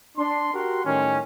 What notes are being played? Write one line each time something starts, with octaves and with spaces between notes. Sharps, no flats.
D4 C6
F#4 G4 A#4 F#5 C6
A2 D#3 G3 C#4